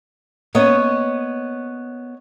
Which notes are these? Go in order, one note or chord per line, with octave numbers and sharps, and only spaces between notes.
A#3 B3 C#4 C#5 D#5